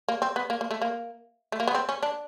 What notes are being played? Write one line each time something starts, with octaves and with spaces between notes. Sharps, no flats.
A#3
C4
B3
A#3
A#3
A3
A#3
A3
A#3
B3
C4
C#4
D4